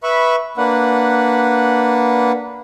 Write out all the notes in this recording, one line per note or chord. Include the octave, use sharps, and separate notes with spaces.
B4 E5 B5 C#6
A#3 D4 B4 F#5